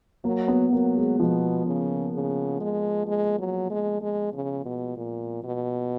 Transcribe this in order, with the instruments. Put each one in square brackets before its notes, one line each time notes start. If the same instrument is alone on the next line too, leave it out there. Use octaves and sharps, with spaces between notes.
[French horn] F#3 [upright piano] A#3
[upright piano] B3
[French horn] F#3 [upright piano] A#3
[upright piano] G#3
[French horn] B2 [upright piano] F3
[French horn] C#3
C#3
G#3
G#3
F#3
G#3
G#3
C#3
B2
A#2
B2